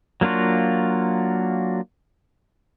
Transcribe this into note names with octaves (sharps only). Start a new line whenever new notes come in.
F#3 A#3 D4 F4 F#4